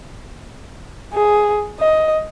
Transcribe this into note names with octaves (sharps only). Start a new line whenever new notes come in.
G#4
D#5